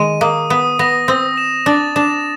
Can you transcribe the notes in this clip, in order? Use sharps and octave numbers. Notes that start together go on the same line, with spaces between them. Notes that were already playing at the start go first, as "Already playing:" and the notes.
Already playing: D#3 G#3 D#7
A#3 D#6
B3 D#6
B3 A#6
C4 D#6
E7
D4 A6
D4 E7